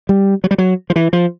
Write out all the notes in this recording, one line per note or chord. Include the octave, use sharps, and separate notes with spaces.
G3
F#3
G3
F#3
F3
E3
F3